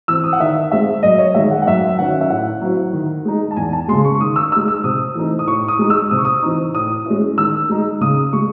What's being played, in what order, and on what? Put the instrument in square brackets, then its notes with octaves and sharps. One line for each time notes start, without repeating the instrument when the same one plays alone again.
[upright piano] E3 C4 E6
D#6
F#5
D#3 E5
G#3 C4 E5
F#2 D#5
C#5
D#3 G#3 E5
F#5
F#5
F#2 E5
D#3 F#3 C#4 F#5
E5
A2 F#5
F#3 C4 E4
D#3
G#3 D#4
A5
E2 G#5
A5
C#3 G#3 C6
C#6
C#6
D#3 D#6
E6
G#3 D#4 E6
E6
C3 D#6
E3 A3 C4 D#4
D#6
A2 C#6
D#6
G#3 D#4
E6
C3 D#6
C#6
D#6
E3 C4 D#4
A2 D#6
G#3 C#4 E4
D#3 E6
G#3 D#4
C#3 D#6
G#3 C#6